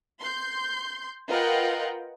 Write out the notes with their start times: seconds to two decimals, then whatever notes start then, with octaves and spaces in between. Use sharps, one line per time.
0.21 C6 G6
1.29 F4 A#4 B4 D#5 F#5 G5